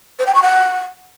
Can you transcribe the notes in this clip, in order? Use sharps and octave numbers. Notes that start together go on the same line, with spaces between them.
C5
G5
C#6
F#5